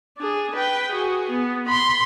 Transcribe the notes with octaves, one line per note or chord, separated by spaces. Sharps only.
D4 G#4
B4 G5
F#4 G#4
B3
B5 C6